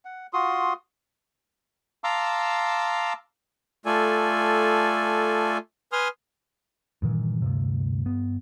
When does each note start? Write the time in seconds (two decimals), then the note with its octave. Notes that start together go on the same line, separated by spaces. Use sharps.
0.05 F#5
0.33 F4 F#4 C6 D#6
2.04 F5 A5 A#5 C6 D6 E6
3.86 A3 F4 A4 D5 G#5
5.92 B4 G#5 C6 D#6 F6
7.02 G2 A#2 D#3 E3
7.42 D2 G2 C3
8.05 G2 B3